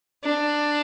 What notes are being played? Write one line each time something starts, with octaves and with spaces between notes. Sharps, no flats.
D4